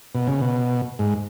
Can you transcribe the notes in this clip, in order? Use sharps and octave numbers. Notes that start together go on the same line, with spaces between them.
B2
C#3
B2
G#2